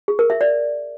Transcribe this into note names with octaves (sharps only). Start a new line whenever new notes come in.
G#4
A#4
E5
D5